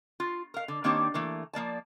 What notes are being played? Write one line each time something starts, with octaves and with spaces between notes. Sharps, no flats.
F4
A#4 F5
D3
D#3 A#3 C4 D4 G4 C#5
E3 A3 A#3
F3 A#3 D5 A5